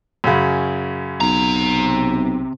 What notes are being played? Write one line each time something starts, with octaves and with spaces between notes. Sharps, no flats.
F#2 C#3
B1 C3 A#5